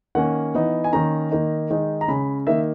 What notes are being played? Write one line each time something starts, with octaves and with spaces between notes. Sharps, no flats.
D#3 A#3 C#4 F#5
E3 B3 D#4
G#5
D#3 A#3 C#4 A#5
D#3 A#3 D#4
D#3 G#3 D#4
A#5
C#3 G#3 C#4 B5
D#3 A#3 D#4 E5